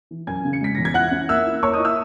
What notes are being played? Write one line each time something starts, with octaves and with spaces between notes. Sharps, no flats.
E3
F#2 G#5 G#6
C#3
C#7
G#3 B6
E2 A#6
G#6
E4 F#5 F#6
C#4
A#3 E5 E6
E4
A#3 C#5 C#6
D#5 D#6
E4
E5 E6